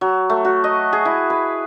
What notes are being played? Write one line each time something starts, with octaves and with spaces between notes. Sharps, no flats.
F#3
A3
F#4
D#5
G#4
E4
B4